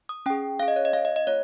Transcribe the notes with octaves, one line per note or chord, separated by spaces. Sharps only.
D#6
C#4 G#4 G5
C#4 G#4 F5
D#5
C#5
D#5
C#4 G#4 F5
D#5
D#5
A#3 F4 C#5